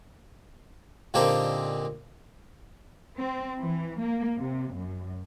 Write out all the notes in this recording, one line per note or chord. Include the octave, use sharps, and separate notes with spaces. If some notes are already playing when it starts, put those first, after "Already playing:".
A#2 D3 C4 D#4 G4
C4
E3
A#3
C3
F#2